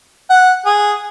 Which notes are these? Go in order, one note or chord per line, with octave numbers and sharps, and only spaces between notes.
F#5
G#4